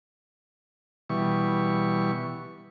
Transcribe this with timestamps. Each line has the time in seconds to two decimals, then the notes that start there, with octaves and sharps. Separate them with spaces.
1.10 B2 E3 G3 C#6